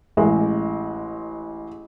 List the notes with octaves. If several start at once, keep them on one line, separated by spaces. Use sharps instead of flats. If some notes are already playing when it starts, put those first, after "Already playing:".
A1 G#3